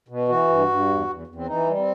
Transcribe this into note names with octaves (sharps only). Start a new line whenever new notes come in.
B2
E3 F#4
G2
G2
E2
E2
E2
C4
E3 D#4
G3
C4